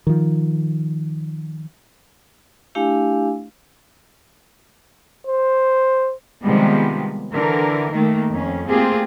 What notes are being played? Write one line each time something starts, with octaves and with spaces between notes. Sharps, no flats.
D#3 F3
A3 D4 E4 G4 F5 G#5
C5
C3 D#3 F3 G3 G#3 B3
D3 E3 A#4
D#3 A3 A#3
F2 C#4
A3 A#3 C4 F4 G4 G#4